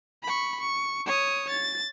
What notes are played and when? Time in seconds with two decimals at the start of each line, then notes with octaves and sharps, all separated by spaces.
0.23 B5 C#6
0.60 C#6
1.06 C#5 D#6
1.50 A6